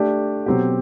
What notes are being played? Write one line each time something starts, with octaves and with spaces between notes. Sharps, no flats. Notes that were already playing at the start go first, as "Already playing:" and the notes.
Already playing: A3 D4 G4 D5
B2 F#3 C4 G4